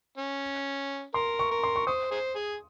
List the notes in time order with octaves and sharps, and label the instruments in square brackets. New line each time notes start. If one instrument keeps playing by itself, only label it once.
[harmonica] C#4
[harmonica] A#4 [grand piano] C6
[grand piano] C#6
[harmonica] A#4
[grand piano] C6
C#6
[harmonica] C5 [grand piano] D#6
[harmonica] G#4 C5
G#4